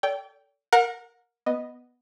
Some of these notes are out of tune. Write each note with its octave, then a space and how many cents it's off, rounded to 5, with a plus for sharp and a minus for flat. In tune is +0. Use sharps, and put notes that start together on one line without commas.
A4 +15 D5 -45 G5 +0
A#4 +0 F#5 -35
B3 +0 D#5 +0